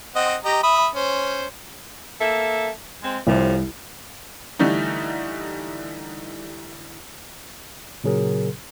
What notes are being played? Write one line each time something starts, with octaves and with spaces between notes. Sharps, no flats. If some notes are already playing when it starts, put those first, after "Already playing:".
C4 D#5 F#5
G4 D#5 A#5
E5 B5 D#6
C#4 C5
A#3 A4 E5
G#3 C4
C2 A2 C3 F3
D3 E3 G3 A3 D#4
A#2 C#3 F#3 G#4 A#4